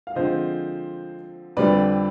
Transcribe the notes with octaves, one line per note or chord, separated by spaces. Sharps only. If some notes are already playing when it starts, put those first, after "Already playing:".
F5
D3 F3 G#3 C4 C5 D#5
F2 D3 G3 C4 B4 D5